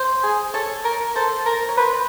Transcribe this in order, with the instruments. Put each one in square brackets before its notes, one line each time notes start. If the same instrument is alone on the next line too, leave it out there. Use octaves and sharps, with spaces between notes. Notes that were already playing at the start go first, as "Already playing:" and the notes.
Already playing: [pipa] C5
[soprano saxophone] G#4
[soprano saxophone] A4 [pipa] C#5
[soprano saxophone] A#4
[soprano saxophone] A4 [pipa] C5
[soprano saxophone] A#4
[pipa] C#5
[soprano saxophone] B4 [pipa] C5